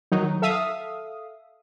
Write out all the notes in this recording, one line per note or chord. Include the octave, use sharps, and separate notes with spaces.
D#3 F#3 D#4
A4 E5 F5 D#6